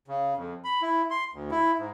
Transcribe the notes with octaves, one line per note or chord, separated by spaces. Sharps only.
C#3
F2
B5
E4
C6
D2
E4
G#2